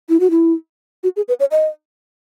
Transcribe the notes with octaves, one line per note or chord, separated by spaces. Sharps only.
E4
F#4
E4
F#4
G#4
B4
C#5
D#5